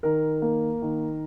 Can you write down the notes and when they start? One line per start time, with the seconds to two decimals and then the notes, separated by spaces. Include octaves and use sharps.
0.03 D#3 A#4
0.42 A#3
0.82 D#3